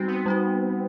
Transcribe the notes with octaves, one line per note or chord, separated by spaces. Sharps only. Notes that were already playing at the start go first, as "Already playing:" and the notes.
Already playing: G3 C4 D#4 F#4
B3
G3 D#4 F#4